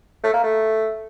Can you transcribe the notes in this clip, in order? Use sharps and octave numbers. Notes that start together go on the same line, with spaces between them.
A3
A#3
A3